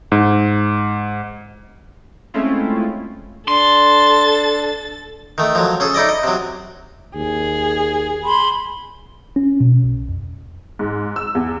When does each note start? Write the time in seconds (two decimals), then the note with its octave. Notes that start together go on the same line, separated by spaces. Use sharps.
0.12 G#2
2.34 G#3 A3 C4 C#4 E4 F4
3.48 D4 A4 C6 A6
5.38 D#3 A3
5.55 F3 F#3
5.80 C#4 G#4 A4
5.94 D#4 E4 D5 D#5
6.09 D#5
6.23 C3 F#3
7.16 D#2 G#4
8.24 B5 C6
9.36 C#4
9.60 B2
9.84 B1
10.09 F2
10.79 G#2
11.16 E6
11.35 E2